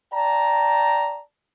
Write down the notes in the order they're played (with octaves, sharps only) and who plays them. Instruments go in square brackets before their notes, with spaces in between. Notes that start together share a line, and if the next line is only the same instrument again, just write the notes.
[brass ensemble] D5 G5 A5 A#5